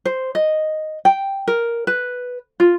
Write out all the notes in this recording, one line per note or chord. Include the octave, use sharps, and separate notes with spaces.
C5
D#5
G5
A#4
B4
F4